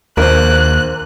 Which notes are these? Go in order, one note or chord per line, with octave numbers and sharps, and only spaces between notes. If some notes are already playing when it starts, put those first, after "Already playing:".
A#1 D#2 A#4 C5 F#6